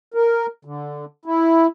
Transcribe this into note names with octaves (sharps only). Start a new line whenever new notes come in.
A#4
D3
E4